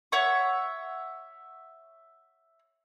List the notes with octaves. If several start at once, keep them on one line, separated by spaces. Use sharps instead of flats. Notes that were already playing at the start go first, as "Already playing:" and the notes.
C#5 E5 F#5 C#6